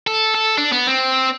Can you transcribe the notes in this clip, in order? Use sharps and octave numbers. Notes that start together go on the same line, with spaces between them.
A4
A4
D4
B3
C4